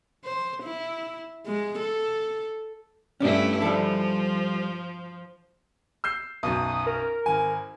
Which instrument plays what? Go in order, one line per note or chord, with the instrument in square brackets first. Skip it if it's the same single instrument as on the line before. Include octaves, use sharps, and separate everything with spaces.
[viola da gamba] C5
E4
G#3
A4
[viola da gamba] G2 A3 E4 [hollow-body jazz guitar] C#4 D4
[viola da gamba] F3 [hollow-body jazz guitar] G3 A4
[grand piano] E6 G6 C7
[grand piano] B1 F#2 [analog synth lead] D#6
[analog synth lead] A#4
[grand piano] G#1 G#5